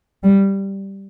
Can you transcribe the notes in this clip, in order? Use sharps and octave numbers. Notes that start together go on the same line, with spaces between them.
G3